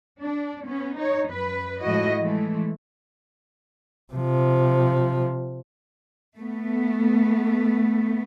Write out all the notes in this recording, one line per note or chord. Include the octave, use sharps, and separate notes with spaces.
D4
B3 C#4
D#4 C#5
F#2 B4
A2 F3 G#3 E4 F#4 D#5
E3 G#3 A3
C3 F3
A3 B3